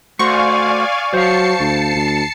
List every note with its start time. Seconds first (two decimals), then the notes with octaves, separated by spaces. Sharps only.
0.19 A3 F#4 C5 D5 F5 G#5 C#6
1.14 F#3 C5 F5 A5 C7 C#7
1.60 D2
1.96 D2